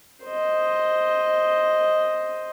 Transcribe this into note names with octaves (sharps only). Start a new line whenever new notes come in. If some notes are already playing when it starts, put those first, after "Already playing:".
C5 D#5